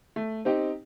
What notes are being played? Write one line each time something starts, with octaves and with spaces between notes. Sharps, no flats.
A3
C4 D#4 G4